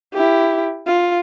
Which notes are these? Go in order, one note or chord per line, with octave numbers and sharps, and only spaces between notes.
E4 G4
F4